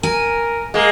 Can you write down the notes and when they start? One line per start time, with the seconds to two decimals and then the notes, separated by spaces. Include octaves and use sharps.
0.03 A#4 G#5
0.74 G#3 A#3